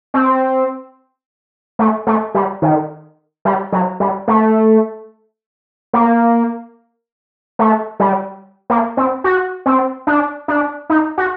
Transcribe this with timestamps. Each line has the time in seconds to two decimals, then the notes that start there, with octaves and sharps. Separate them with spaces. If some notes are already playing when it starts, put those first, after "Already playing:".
0.14 C4
1.79 A3
2.07 A3
2.35 G3
2.62 D#3
3.45 G3
3.72 F#3
4.00 G3
4.28 A3
5.94 A#3
7.59 A3
8.00 G3
8.70 A#3
8.97 C4
9.24 F#4
9.66 C4
10.07 D4
10.48 D4
10.90 D#4
11.18 F#4